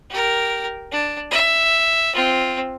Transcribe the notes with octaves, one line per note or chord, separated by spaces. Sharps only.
G4 A#4
D4
E5
C4 F4